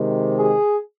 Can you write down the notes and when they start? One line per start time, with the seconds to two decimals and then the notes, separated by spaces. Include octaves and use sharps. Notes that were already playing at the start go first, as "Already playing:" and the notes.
Already playing: C3 D#3 G#3
0.35 G#4